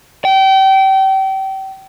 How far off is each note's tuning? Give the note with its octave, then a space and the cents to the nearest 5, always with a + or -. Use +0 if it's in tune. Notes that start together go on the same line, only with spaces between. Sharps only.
G5 -30